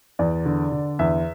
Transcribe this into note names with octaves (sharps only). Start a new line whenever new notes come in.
E2 D5
D3
D3
E2 E5